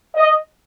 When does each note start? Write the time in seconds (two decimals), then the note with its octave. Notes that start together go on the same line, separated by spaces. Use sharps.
0.16 D#5